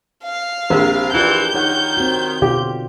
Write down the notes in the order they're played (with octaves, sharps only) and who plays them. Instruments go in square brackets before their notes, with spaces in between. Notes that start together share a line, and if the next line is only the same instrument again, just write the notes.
[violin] F5
[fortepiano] A#1 [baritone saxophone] C3
[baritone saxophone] E3 [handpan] D4 F4 G4 [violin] G6
[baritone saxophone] D#3 [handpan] D#4 C#5 F#5
[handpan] C4 F#4
[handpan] B2 D3 F4 [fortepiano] G4